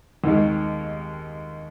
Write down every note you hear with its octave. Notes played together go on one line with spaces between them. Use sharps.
D#2 D#3 G#3